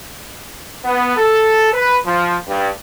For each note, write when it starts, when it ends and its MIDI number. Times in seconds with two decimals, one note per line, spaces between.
0.85 1.13 59
1.17 1.69 69
1.73 1.95 71
2.05 2.35 53
2.47 2.68 43